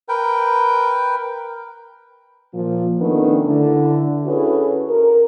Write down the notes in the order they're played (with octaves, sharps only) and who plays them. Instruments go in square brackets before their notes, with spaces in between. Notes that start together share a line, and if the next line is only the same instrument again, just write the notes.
[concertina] A#4 B4 G5
[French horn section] A#2 F3
D#3 A3 B3 C#4 D4
D3 E4
C#4 E4 F#4 G#4 A4 B4
A#4